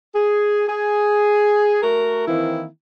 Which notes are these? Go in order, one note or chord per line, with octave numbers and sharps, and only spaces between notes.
G#4
G#4
A3 F#4 A#4
D#3 E3 A#3 C4 E4